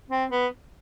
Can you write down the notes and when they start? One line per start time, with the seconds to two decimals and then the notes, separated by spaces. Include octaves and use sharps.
0.09 C4
0.31 B3